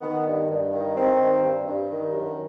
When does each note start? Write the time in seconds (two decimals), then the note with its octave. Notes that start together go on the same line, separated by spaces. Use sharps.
0.01 D#3 B3
0.26 G2
0.49 G2
0.73 D#3
0.95 D#3 C4
1.19 G2
1.42 G2
1.66 G2
1.91 D#3
2.13 F#2